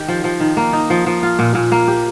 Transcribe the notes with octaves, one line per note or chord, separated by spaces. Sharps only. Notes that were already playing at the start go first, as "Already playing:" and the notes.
Already playing: D#3 G4
F3
F3
D#3
A#3
D#4
F3
F3
F4
A#2
A#2
A#3
G4